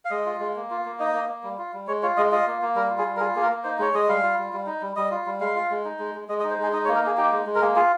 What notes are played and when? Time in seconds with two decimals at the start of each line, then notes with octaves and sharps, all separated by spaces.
0.05 F5
0.11 G#3 D#5
0.26 F4
0.40 G#3
0.56 A#3
0.71 F4
0.85 A#3
1.00 D#4 D#5
1.14 A#3
1.28 A#3
1.43 G3
1.59 F4
1.74 G3
1.87 G#3 C#5
2.02 F4 C#5
2.17 G#3 D#5
2.31 F4 D#5
2.47 A#3
2.62 A#3
2.75 G3 A#4
2.90 F4
2.98 G#4
3.05 G3
3.16 A#4
3.20 F4 G#4
3.35 A#3 G#4
3.42 A#4
3.50 A#3
3.64 D#4 C5
3.79 G#3 C#5
3.94 G#3 D#5
4.08 G3 F5
4.23 F4
4.38 G3
4.53 G3
4.67 D#4
4.82 G3
4.96 G3 D#5
5.11 F4
5.26 G3
5.40 G#3 F5
5.55 F4
5.70 G#3
5.85 D#4
5.99 G#3
6.15 G#3
6.28 G#3 D#5
6.40 D#5
6.44 D#4
6.50 C5
6.58 G#3 G#4
6.73 D#4 D#5
6.85 C#5
6.88 A#3
6.96 A#4
7.03 A#3 G#4
7.17 D#4 G4
7.33 G#3
7.46 G#3
7.55 A#4
7.61 A#3 G#4
7.76 F4 G#4